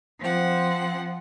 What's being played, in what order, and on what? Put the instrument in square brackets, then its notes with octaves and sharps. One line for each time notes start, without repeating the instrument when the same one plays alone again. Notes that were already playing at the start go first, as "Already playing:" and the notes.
[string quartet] F3 C4 F#5